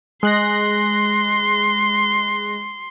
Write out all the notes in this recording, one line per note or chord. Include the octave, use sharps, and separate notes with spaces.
G#3 C6 F#6 A#6